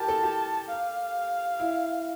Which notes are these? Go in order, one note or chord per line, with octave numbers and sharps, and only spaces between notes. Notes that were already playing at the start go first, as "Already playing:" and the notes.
Already playing: G4 A#4 A5
A4
G4
F5
E4